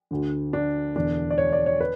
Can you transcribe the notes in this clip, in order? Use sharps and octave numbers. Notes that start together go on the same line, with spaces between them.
D2 D3
D4
E1 E2 D3 D4
D5
C#5
D5
C#5
B4